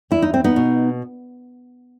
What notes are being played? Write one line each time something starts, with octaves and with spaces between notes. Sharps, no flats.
E2 E4
D#4
C4
B3 D#4
B2